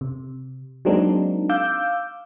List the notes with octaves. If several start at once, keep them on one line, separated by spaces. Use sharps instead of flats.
C3
F#3 G#3 A#3 C4 D4 D#4
F5 D6 E6 G6